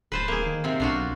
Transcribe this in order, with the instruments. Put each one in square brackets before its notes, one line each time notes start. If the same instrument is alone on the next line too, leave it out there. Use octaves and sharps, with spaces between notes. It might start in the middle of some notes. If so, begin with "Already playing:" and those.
[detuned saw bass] D1 [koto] B4 C5 A5
[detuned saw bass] D1 [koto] A#3 G#4
[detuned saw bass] D#3
[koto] C3 C4
[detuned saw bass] B1 [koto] D4 F4 F#4